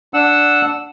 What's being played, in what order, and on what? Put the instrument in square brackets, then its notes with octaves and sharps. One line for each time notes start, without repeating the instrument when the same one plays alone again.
[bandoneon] D4 F#5 E6